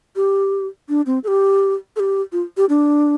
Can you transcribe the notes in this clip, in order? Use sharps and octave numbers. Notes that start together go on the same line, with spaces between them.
G4
D4
C4
A4
G4
A4
G4
F4
G4
D4